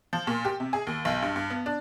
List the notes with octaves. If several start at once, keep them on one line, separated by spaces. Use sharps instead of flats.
F3
A#2
G4
C3
G#4
D#2
B1
G2
G2
B3
D4